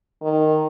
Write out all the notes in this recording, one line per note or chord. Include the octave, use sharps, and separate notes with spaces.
D#3